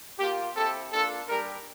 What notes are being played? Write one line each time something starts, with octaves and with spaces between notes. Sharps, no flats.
A#3 F4 G4
C4 E4 G4 A4
A#3 D4 F4 A4
G3 D4 G4 A#4